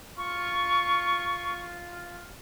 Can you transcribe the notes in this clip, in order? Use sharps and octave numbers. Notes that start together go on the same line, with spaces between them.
F4 C#6